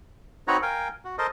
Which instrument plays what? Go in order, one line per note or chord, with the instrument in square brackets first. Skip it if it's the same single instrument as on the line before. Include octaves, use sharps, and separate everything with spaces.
[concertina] C4 D#4 F#4 B4 C#5 A#5
A#4 F5 G5 G#5
F#4
A4 A#4 C5 D#5